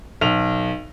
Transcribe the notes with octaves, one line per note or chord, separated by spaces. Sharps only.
B1 F7